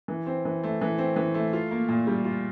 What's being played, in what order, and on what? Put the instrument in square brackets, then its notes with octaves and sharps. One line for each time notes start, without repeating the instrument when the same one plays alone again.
[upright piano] E3
C4
E3
A3
E3
C4
E3
A3
F4
A#3
A#2
G3
F4